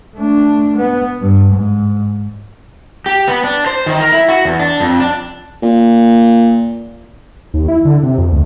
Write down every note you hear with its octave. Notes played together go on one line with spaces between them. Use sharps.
A3 D4
B3
G2
G#2
G4
B3
D4
C5
D#3
A#4
E4
F#4
E2
D4
F2
D4
A#2
D#2
E4
D3
C3
F2
D2